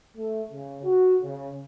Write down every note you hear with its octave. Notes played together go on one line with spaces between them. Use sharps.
A3
C#3
F#4
C#3